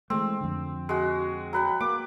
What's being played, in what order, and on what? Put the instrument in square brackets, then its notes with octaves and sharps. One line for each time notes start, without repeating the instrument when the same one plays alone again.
[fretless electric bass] E3 G#3 A3 [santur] C4
[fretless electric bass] F2 D3
[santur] G#3 F#4
F#3 B4 G5
[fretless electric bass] A#3 [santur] D6